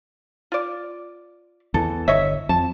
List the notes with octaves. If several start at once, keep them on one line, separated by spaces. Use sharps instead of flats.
F4 D5
E2 E3 A4
G1 C#5 D#5 E5
F2 A5